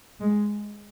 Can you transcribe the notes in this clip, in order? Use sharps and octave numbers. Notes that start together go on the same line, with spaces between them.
G#3